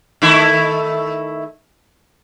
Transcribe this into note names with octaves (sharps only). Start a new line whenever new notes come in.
D#3 A3 E4